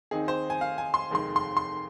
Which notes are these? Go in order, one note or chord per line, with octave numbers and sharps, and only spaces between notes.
D#2 D#3 C4 D#4 G#4
C5
G#5
F5
G#5
C6
F1 D#2 D#3 G#3 C6
C6
C6